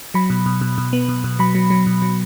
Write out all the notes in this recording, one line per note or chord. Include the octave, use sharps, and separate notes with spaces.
F#3 B5
B2
B2
B2
B2
B3
B2
B2
F#3 B5
F#3
F#3
B2
F#3